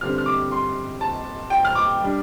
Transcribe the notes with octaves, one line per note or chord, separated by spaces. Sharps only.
G2 D3 G3 C4 F6
F6
D6
C6
A5
G5
F6
D6
G3 D4